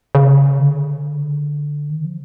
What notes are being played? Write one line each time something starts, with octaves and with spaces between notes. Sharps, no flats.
C#3
D3
D#3
F3